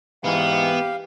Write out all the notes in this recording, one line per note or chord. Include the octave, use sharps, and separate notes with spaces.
G#2 E3 B3 G4 F5